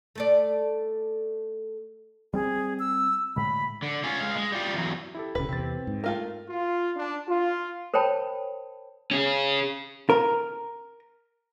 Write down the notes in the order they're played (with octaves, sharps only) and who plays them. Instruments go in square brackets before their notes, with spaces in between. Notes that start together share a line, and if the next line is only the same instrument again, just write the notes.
[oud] A3 A4 D5
[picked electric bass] G3 C4 [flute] G#4
[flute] E6
[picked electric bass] A2 D3 G#3 [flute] B5
[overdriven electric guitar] D3
C#4 F4
G#3 F5
G#3
G3 F4
E2 F#3
[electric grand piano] E4 G4 A4
[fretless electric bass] D1 C#3 [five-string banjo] B4
[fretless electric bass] E2 C3 [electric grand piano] C4 A6
[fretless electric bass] G#2
[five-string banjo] A3 F4 A#4
[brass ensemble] F4
D4
F4
[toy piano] A#4 C5 C#5 G5 A5 B5
[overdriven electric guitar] C#4 G#4
[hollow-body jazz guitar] A#4